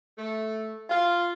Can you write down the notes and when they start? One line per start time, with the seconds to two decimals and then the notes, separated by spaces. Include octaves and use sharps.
0.18 A3
0.90 F4